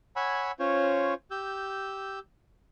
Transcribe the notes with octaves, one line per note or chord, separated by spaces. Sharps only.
C#5 F#5 G#5 B5 E6
C#4 F4 C5 C#5
G4 E6 G6